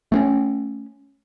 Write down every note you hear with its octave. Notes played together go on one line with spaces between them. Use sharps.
A3 C4 C#4